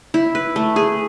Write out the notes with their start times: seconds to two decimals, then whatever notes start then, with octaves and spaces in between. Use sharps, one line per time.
0.14 E4
0.35 B4
0.56 A3
0.76 G#4